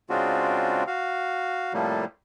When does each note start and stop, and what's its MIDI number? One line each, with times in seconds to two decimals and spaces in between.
0.10 0.84 49
0.10 0.84 56
0.10 0.84 60
0.10 0.84 62
0.10 0.84 65
0.10 0.84 66
0.87 1.73 66
0.87 1.73 77
1.73 2.05 45
1.73 2.05 48
1.73 2.05 53
1.73 2.05 55
1.73 2.05 57
1.73 2.05 58